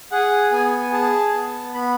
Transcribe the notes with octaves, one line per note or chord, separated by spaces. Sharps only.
G#4 F#5
B3 G#5
G#4 A5
B3
B3 B5